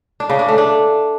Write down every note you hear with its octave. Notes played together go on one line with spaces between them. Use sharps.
D4
C#3
D4
A3
D4